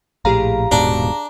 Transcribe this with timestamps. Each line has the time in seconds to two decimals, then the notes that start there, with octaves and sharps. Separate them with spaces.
0.25 A#1 A2 G4 G#4 F5 A#5
0.72 D#1 G#2 B2 D4 A#5